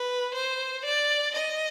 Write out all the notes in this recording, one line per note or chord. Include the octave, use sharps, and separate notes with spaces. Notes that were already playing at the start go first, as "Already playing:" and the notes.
Already playing: B4
C5
D5
D#5